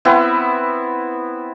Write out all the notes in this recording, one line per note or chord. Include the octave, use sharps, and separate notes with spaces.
B3 C4 E4